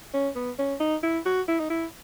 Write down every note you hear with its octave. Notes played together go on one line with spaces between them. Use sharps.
C#4
B3
C#4
D#4
E4
F#4
E4
D#4
E4